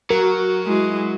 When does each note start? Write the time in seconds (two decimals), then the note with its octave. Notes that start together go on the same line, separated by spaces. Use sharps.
0.10 F#3 F#4 A#4
0.66 G#3 E4